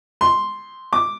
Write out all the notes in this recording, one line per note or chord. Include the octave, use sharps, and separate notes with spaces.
C6
D6